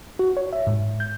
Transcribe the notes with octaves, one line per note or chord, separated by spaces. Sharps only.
F#4
C#5
E5
G#2
G6